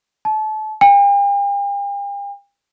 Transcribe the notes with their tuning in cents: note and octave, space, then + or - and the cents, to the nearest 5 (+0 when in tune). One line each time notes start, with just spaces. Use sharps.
A5 -30
G5 +45